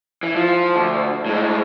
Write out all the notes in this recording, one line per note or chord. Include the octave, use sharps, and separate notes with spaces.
E3
F3
D2
A2 G#3